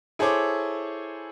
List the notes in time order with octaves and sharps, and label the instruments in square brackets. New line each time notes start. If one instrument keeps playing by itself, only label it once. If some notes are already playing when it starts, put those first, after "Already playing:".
[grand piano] E4 G#4 A4 C5 C#5 D6